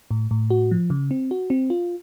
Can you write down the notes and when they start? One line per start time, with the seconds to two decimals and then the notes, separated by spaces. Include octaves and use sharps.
0.11 A2
0.31 A2
0.50 F#4
0.71 F3
0.90 C#3
1.11 C4
1.31 F#4
1.50 C4
1.70 F4